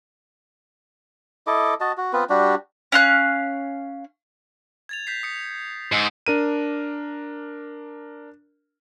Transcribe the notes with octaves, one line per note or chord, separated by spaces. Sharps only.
E4 A4 D#5 D6
F#4 D#5 A5
F#4
B3 C4 F4 B4
G3 D4 F#4 G4
C#4 F5 F#6
G#6 A6 F7
G6 B6 C7
D#6 C#7
G#2 E6 C#7 D7
D4 A#4 D#7